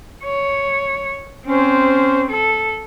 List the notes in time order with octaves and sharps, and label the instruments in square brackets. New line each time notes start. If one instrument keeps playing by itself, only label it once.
[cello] C#5
[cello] C4 C5 [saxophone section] C#4
[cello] A4